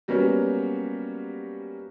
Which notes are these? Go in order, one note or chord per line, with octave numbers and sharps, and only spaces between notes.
F#3 G3 A#3 B3 C#4